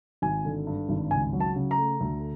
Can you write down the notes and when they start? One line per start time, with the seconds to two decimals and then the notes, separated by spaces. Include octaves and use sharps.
0.22 G#1 G#5
0.45 D3
0.67 G2
0.89 G#1
1.11 C#2 G#5
1.33 F#3
1.40 A5
1.56 C#3
1.71 A#5
1.78 A3
2.01 D2